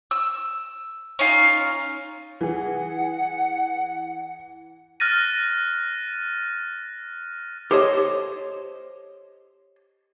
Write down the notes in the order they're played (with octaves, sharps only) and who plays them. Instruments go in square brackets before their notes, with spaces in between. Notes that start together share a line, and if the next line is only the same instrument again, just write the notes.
[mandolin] E6
C#4 D#4 F4
[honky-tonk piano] E3 G#4 [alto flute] F#5
[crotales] F6 F#6 A6 A#6 D#7
[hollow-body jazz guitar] G4 A4 C5 C#5 D#5